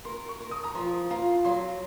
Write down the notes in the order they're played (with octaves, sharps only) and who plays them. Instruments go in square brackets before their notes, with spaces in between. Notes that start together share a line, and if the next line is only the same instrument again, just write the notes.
[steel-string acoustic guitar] A#4 [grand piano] C6
[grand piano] C#6
[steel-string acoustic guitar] A#4
[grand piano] D#6
A#5
[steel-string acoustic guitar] F3 [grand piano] C6
[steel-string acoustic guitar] F4 [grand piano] A#5
[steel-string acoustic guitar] F#3 [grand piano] C6